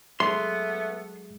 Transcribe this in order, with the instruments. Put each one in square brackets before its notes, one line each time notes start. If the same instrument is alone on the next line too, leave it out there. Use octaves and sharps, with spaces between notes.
[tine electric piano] F#3 G#3 [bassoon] A3 [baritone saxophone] B3 [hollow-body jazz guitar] C6